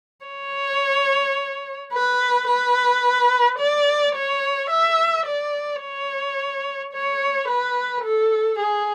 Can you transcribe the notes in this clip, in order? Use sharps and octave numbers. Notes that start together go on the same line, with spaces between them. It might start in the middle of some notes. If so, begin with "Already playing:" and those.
C#5
B4
B4
D5
C#5
E5
D5
C#5
C#5
B4
A4
G#4